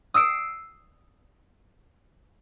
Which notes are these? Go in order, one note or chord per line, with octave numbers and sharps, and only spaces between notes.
D#6 E6 C7 D7